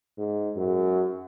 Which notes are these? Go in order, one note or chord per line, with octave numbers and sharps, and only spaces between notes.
G#2
F#2